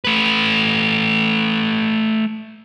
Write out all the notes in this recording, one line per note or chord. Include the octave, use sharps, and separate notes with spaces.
A3 B4